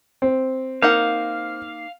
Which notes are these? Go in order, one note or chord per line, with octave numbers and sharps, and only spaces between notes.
C4
A#3 D#4 F5 F#5